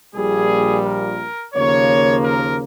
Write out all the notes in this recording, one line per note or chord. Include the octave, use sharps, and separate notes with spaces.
A#1 A#2 G3 G#4
A#4
D#2 C#3 F3 A#3 C#5
A#4